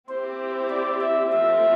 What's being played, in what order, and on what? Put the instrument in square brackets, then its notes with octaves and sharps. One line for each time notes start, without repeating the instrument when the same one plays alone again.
[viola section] C4 E4 G4 [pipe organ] C5
[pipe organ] D5
E5
[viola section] F3 A3 C4 F4 [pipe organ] E5